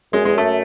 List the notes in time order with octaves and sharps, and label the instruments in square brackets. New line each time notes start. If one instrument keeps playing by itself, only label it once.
[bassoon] F#2 [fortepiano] G#3
[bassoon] E2 [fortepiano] G#3
[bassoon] F#2 [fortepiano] A3